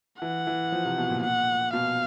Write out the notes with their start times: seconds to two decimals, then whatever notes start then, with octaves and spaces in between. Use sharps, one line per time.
0.22 E3 F#5
0.47 E3
0.72 F3
0.85 C3
0.98 B2
1.10 A#2
1.23 F#5
1.73 B2 F5